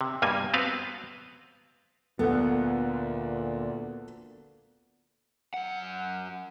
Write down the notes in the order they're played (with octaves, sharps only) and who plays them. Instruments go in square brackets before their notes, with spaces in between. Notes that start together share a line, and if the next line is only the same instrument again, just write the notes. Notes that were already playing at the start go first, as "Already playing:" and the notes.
[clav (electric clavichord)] C3
G2 B2 G3 A#3 G#5
B3 C4 F#4 B4 F5
[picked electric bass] D2 [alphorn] A#2 [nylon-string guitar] B3 [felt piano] A4 F#5
[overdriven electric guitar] F#2 F#5